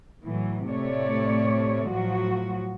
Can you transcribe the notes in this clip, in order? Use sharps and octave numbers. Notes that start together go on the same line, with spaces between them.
A2 E3 F#3
A2 C3 A3 C#5 D5
A2 F3 F#3 F#4